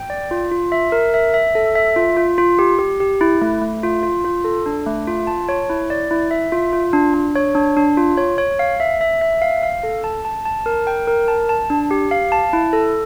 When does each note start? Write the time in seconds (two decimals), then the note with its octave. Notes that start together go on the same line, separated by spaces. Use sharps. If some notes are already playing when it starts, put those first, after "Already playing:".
Already playing: G5
0.10 D5
0.31 F4
0.51 F4
0.72 E5
0.92 A#4
1.14 E5
1.34 E5
1.55 A4
1.76 E5
1.96 F4
2.17 F4
2.38 F4
2.59 G4
2.79 G4
3.00 G4
3.21 E4
3.41 A3
3.62 A3
3.83 F4
4.03 F4
4.24 F4
4.44 A4
4.66 D4
4.87 A3
5.07 F4
5.27 A5
5.49 C#5
5.70 E4
5.90 D5
6.11 E4
6.31 E5
6.52 F4
6.73 F4
6.93 D4
7.14 D4
7.35 C#5
7.55 D4
7.77 D4
7.97 F4
8.17 C#5
8.38 C#5
8.59 F5
8.80 E5
9.01 E5
9.21 E5
9.42 F5
9.63 F5
9.83 A4
10.04 A5
10.25 A5
10.45 A5
10.66 A#4
10.87 G5
11.07 A#4
11.28 A5
11.49 A5
11.70 D4
11.91 G4
12.11 F5
12.32 A5
12.53 E4
12.73 A4